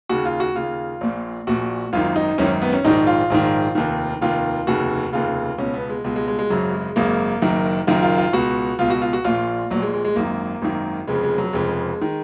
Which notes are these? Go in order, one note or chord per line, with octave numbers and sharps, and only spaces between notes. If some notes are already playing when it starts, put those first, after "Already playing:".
D#2 C#3 F#4
F4
F#4
D#2 C#3 F4
A#1 A#2
A#1 A#2 F#4
G#1 F#2 D#3 F4
D#4
G#1 F#2 D#3 C#4
B3
C#4
A#1 G#2 D#3 D#4
F4
A#1 G#2 D#3
F1 D#2 D#3
F1 D#2 D#3 F4
F1 D#2 C#3 F#4
F1 D#2 C#3 F4
C#2 B2 C#4
B3
G#3
C#2 B2 G#3
G#3
G#3
G#3
G#1 F#2 C#3 F#3
G#3
G#1 F#2 C#3 A#3
F#1 F#2 D#3
F#1 F#2 D#3 F4
F4
F4
C#2 B2 F#4
C#2 B2 F4
F#4
F4
F#4
A#1 A#2 F4
A#1 A#2 F#3
G#3
G#3
G#3
G#1 F#2 D#3 A#3
G#1 F#2 D#3
F1 F2 C#3 G#3
G#3
F#3
F1 F2 C#3 G#3
D#3